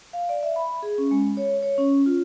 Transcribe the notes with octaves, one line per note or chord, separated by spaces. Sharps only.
F5
D5
E5
B5
G#4
C#4
G#3
C#5
C#5
C#4
F4